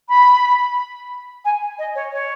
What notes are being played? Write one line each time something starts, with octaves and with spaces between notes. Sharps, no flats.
B5
G#5
D#5
C#5
C#5